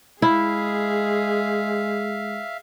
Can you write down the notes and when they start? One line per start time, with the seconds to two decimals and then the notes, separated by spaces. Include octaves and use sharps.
0.22 G#3 E4 G#4 E5 F5